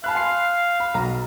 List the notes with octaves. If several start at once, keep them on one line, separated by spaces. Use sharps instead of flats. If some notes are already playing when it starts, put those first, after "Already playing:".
F5 A5 B5 F#6
G#5 C6 C7
B5
B1 A#5